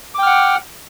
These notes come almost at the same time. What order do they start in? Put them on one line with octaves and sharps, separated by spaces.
D6 G5 F6 F#5